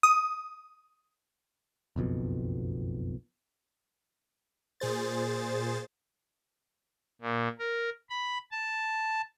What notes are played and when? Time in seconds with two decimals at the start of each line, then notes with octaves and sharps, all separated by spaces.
0.03 D#6
1.96 F#1 B1 F2 B2
4.80 A#2 G#4 C5 A6
7.22 A#2
7.59 A#4
8.10 B5
8.52 A5